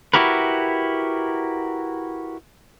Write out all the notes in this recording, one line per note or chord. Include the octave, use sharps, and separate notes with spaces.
E4 F#4 G4 A#4 B4